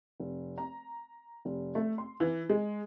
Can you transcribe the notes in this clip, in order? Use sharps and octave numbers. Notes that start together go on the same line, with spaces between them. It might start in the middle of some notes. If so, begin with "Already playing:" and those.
F1
A#5
F1
A3
C6
E3
G#3